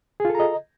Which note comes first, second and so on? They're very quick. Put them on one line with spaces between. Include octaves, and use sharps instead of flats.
G#4 F4 A4 A#5 D#5